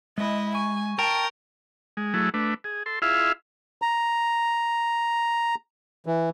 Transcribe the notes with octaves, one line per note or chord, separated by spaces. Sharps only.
G#3 E4 D#5
G#5 C#6
A#4 G5 A5 G6 D7
G#3
F#3 A3 E4 G#4
A3 D4 B4
G#4
A4 C6
E4 F4 G#4 E5 F5
A#5
E3